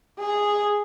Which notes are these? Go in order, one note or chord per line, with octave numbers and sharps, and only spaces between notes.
G#4